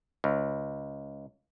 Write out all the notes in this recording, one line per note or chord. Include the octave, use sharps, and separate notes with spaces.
C#2